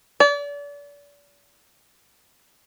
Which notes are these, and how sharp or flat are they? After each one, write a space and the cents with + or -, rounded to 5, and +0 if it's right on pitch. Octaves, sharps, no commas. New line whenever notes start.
D5 -35